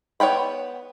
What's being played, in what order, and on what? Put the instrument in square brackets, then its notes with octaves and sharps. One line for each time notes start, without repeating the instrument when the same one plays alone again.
[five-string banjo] B3 C#5 F#5 G5 B5